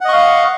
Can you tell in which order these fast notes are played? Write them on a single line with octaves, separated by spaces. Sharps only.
F#5 D#5 C#6 F5